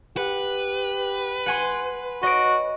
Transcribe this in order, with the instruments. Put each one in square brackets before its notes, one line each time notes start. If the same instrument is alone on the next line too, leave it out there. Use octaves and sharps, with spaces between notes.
[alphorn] G4 [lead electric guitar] B4 [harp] F#5
[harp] F#5 G#5 C6
[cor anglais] F#4 [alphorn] C#5 [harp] D#5 D7